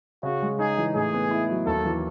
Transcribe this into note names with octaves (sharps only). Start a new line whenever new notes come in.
C#3 F#4
G#3
D#4 G#4
E3
A2 G#4
B3
E4
F#3
D#2 A4
E3